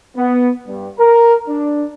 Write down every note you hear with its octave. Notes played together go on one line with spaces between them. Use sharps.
B3
G2
A#4
D4